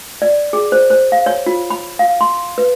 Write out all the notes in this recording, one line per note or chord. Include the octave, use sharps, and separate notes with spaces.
D5
G#4
C5
C5
F5
C#5
F4
B5
F5
C6
B4